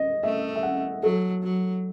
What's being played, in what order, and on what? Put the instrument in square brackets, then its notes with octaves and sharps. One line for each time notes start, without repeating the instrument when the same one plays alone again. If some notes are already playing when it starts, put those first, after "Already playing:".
Already playing: [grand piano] D#5
[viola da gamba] A3 [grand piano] E5
[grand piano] E5
F#5
[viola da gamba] F#3 [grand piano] A4
[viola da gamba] F#3